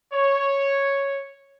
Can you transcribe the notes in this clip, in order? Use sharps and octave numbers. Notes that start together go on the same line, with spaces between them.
C#5